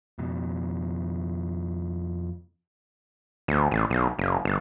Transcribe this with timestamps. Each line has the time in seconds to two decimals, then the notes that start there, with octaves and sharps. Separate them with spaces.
0.19 F2 B2
3.48 D2
3.71 A1
3.90 B1
4.19 F#1
4.45 G1